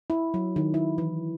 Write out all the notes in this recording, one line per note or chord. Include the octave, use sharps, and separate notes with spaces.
E4
F#3
D#3
E4
E3